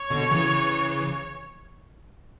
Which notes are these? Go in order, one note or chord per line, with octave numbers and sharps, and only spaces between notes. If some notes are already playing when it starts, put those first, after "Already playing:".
Already playing: C#5
B2 D3
C#3 E3